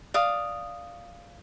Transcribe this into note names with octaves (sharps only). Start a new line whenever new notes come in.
D5 F5 D#6